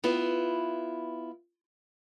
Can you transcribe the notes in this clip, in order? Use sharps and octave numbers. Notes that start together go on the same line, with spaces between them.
B3 E4 F4